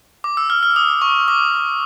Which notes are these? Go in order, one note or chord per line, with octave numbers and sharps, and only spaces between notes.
D6
E6
F6
F6
D#6
C#6
D6